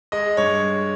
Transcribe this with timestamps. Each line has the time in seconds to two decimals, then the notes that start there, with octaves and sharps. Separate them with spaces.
0.12 G#3 D#5
0.37 G2 C#5